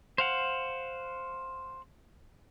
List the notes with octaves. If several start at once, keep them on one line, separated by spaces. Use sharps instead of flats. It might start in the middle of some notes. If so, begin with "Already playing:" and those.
C5 F5 F#5